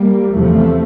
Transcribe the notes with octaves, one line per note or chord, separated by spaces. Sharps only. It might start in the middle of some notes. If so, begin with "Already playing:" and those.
Already playing: G3 A#3
E2 C3 F3 A3